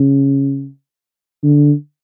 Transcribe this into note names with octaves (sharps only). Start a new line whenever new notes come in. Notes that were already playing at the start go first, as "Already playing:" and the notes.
Already playing: C#3
D3